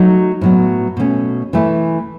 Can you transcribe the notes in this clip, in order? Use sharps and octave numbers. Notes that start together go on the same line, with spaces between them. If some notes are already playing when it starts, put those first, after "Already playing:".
Already playing: F#3 A3 D#4
A2 F#3 B3
B2 A3 C#4
E3 A3 E4